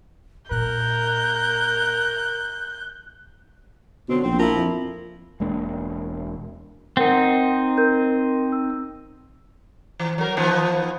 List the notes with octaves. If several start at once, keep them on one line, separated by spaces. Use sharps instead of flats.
A#2 A#4 F#6 G6
B2 D3 F#3 C4
A#1 C4
F3 E4 A#4
F2
E1 G#3 A#3 D4
C4 D#4 A#4 F#5 G5
A#4 G6
E6
E3
F#3 A#4
D#3 F3 B3